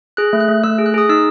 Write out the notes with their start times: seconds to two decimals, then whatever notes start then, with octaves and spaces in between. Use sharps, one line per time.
0.17 G#4 F#6
0.33 A3
0.40 F#6
0.48 A3
0.64 A3 E6
0.78 G#4
0.86 F#6
0.94 G#4 D#6
1.09 D#4 E6